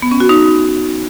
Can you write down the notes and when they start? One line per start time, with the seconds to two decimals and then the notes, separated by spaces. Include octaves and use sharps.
0.02 B3
0.11 C#4
0.20 F#4
0.29 D#4